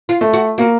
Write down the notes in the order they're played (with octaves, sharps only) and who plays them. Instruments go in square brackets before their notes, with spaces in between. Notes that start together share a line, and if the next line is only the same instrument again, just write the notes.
[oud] F4
[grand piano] A3
[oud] F#4
[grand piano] A#3 [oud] F#4